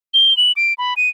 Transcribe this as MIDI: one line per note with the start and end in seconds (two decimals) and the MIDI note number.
0.14 0.36 103
0.37 0.52 102
0.57 0.74 98
0.78 0.94 83
0.97 1.09 99